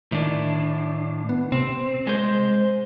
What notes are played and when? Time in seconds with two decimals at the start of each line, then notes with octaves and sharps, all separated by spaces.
0.12 A2 D#3 D4
1.29 B3
1.52 C3 C4
2.07 G#3 C5